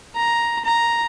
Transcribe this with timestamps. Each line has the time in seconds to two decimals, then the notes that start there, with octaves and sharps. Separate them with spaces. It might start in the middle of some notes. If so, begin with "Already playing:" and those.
0.16 A#5
0.65 A#5